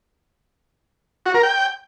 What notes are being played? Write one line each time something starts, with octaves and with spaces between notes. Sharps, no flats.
F#4
A#4
G5